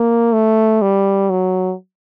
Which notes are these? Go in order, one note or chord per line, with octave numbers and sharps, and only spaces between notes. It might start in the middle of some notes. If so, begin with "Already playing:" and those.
Already playing: A#3
A3
G3
F#3